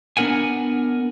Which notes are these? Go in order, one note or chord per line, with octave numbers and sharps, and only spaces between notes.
B3 D4 A#4 F#5 G#5